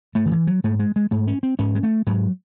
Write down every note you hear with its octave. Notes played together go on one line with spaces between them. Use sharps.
G#2 A3
D#3
E3
F#3
G#2 A3
G#3
G#3
G#2 A3
C#4
C4
G#2 C#4
G#3
A3
G#2 F#3